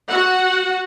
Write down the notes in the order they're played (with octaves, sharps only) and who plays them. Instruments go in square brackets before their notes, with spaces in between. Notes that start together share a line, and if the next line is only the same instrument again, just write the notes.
[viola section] F#4 F#5